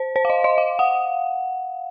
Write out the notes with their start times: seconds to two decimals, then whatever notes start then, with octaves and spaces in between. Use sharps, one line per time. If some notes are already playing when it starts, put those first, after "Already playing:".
Already playing: C5
0.16 C5
0.25 F5
0.30 D#5
0.44 D#5
0.58 F5
0.79 F#5